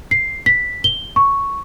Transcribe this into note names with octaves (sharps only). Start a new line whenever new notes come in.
C7
B6
G7
C#6